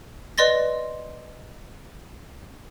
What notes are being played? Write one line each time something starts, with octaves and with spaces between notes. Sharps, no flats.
B4 D5 D#5 C6 A6 A#6